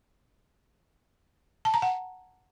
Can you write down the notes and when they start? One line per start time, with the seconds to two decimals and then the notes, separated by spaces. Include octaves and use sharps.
1.65 A5
1.74 A#5
1.82 F#5